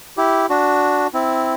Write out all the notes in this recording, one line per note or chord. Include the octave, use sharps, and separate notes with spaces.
E4 G4
D4 F#4
C4 E4